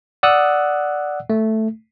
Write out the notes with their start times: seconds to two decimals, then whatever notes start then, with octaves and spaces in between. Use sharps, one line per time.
0.23 D5 F#5 D#6 E6 F#6
1.30 A3